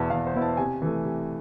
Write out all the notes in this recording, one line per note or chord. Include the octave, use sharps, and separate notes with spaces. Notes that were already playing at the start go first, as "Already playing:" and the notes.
Already playing: E2 B2 B3 E4 A5
E2 F5
C5
B2 B3 E4
A5
C3 G#5
E3 A3
C3